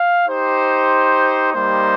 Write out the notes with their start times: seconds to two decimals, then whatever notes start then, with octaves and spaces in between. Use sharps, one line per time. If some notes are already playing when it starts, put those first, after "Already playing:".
Already playing: F5
0.28 D#4 G4 C5
1.53 G3 A#3 D#4 G4 C5